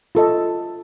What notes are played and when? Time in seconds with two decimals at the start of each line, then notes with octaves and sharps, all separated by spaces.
0.15 F4 A4 D#5